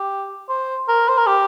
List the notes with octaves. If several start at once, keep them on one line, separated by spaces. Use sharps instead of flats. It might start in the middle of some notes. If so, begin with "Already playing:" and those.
Already playing: G4
C5
A#4
C5
A#4
G4